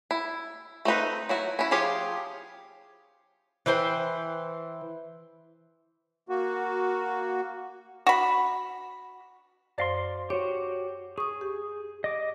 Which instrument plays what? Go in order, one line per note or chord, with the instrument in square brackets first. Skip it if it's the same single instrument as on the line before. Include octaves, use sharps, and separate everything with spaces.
[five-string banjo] E4
A3 C4 D#4 B4
F#3 E4 F#4
C#4 E4
F3 F4 G4 G#4 C#5
[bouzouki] E3 B4 C5 G5
[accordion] A#3 F#4
[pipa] F#4 B5
[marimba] F#2 C5 A#6 [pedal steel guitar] D5 F5 C6
[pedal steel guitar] F#4 G4 [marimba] C#5
[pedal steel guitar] G#4 [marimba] C#6 D#6
[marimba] G4
[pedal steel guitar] D#5 D6